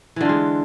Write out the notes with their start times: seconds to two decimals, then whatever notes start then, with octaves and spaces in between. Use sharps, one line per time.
0.16 E3
0.21 D3
0.25 F4
0.29 G#3